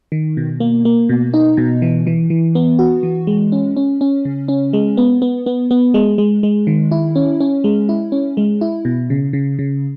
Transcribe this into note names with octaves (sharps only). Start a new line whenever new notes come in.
D#3
B2
A#3
A#3
B2
D#4
B2
E3
E3
E3
B3
F#4
E3
G#3
C#4
C#4
C#4
C#3
C#4
G#3
B3
B3
B3
B3
G#3
G#3
G#3
D#3
E4
C#4
C#4
G#3
E4
C#4
G#3
E4
B2
C#3
C#3
C#3